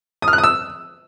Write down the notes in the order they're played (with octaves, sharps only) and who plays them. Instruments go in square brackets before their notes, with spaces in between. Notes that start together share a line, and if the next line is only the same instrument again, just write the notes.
[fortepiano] D#6
F6
F#6
D#6
E6